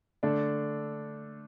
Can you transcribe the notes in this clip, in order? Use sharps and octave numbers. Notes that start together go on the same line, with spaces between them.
D3 A3 D4 A4